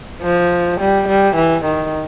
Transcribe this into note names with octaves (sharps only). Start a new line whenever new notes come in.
F3
G3
G3
E3
D#3